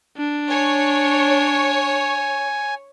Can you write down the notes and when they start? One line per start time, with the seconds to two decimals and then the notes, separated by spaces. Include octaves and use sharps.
0.17 D4
0.50 C#5 G#5